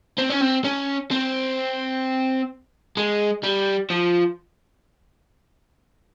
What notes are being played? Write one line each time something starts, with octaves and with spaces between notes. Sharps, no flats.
C4
C#4
C4
C#4
C4
G#3
G3
F3